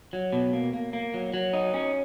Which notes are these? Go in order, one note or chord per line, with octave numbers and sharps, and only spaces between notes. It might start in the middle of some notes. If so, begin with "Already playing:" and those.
F#3
B2
A#3
A#3
A#3
F#3
F#3
D#4
C#4